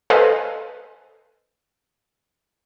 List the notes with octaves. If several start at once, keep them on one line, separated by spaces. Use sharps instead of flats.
A4 B4 C5 D#5 F5 G#5